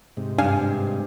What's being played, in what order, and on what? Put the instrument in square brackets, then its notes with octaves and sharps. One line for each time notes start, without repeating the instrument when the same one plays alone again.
[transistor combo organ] G#2 C3
[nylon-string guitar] G2 [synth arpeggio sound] D4 F5 G#5